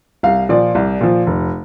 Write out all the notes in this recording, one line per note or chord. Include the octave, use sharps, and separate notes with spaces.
C2 F5
A#2 F3 D5
C2
A#2 F3
F1